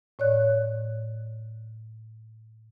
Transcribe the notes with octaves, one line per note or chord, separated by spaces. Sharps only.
A2 C#5 D5 F#6